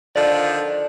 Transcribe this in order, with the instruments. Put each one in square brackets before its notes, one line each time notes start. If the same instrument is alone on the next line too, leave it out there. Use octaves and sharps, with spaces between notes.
[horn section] D3 D#3 F3 [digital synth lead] D5